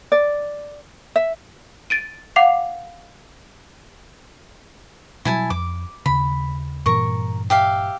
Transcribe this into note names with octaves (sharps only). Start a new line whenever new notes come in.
D5
E5
A6 D7 D#7
F5 F#5 D6 C7 F7
B2 F#3 G3 E4 G#5 A5
F2 D6
D#2 C#3 B5
G2 A#2 E3 A#4 C#6
G4 E5 F5